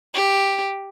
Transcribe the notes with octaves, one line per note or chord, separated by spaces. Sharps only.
G4